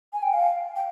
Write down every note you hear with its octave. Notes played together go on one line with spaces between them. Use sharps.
G#5
G5
F5
G5